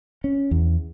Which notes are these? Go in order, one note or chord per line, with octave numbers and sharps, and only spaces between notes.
C#4
E2